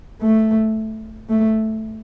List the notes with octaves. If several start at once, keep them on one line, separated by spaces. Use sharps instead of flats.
A3
A3